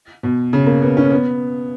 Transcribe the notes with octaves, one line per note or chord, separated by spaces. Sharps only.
B2
C#3
A#3
B3
C#4
B3